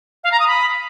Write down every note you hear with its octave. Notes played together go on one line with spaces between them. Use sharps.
F5
A#5
D#6
B5